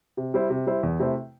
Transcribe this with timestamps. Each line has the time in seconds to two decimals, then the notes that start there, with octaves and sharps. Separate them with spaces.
0.17 C3
0.34 G3 E4 C5
0.50 C3
0.67 G3 E4 C5
0.83 E2
1.00 C3 A3 E4 C5